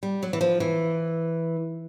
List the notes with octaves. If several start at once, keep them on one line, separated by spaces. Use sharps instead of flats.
G3
F#3
E3
F3
E3